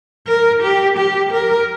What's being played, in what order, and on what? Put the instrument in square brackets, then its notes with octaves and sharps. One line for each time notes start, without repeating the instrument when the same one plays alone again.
[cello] A#4
G4
G4
A#4